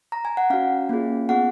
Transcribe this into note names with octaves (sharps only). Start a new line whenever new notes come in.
A#5
G#5
F#5
C#4 F#4 F5
A#3 C#4 F4 G#4
B3 F4 G#4 F#5